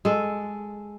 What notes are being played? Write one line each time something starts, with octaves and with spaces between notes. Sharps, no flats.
G#3 A4